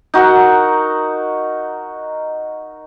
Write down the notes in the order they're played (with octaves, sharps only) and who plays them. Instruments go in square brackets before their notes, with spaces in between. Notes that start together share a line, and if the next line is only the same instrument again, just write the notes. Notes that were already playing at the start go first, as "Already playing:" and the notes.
[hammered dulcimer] D#4 F#4 A#4 F#5